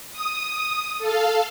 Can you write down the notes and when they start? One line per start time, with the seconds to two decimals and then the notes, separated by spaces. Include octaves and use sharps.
0.12 D#6
0.98 A4 F5